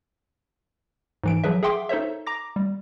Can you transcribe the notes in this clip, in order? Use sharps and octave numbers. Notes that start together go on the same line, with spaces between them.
G#2 E3 D7
F3 F#3 G#4 B4 E5
G#4 E5 F#5 G5 C6 D6
D#4 A4 C5 C#5 E5
A#5 D6 A#6
G3